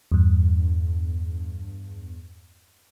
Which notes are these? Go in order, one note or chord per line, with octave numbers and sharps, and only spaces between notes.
E2 G2